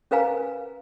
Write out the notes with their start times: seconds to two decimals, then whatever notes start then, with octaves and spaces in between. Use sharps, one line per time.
0.11 C#4 A#4 B4 F5 G#5 A#5